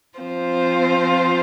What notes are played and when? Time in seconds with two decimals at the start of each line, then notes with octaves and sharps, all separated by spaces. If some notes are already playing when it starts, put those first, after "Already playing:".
0.18 F3 C4 F4 C5